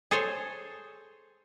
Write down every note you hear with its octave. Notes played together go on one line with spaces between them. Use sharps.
G#4 A4 C5 C#5 G#5